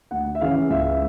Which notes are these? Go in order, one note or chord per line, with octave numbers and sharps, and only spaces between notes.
D2 F#5
E5
C#3 E3 G#3 C#4 F5
C#2 E5